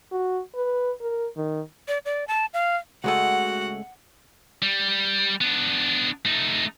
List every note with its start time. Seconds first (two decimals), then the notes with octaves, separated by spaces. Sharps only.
0.11 F#4
0.55 B4
1.01 A#4
1.37 D#3
1.88 D5
2.05 D5
2.28 A5
2.54 F5
3.04 C#2 G#3 A3 F#4 F#5
4.62 G3
5.41 B3 D4
6.25 A3 D#4